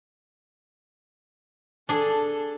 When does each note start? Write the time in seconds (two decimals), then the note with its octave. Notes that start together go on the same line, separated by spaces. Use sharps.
1.89 D4 G#4 A4